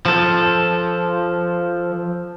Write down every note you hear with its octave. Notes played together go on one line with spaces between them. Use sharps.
F3 A4